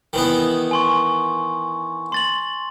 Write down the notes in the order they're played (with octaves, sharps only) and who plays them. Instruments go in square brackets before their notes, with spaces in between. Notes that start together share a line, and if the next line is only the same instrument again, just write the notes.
[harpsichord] D#3 E3 B3
[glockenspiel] G#5 C6 C#6
C6 A6 F#7